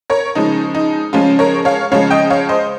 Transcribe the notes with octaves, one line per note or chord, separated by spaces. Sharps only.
A#4 C#5
C#3 F3 G#3 D#4
D#4
C#3 F3 G#3 C#4 F4
A#4 C#5
C#5 F5
C#3 F3 G#3 C#5 F5
D#5 G5
C#5 F5
C5 D#5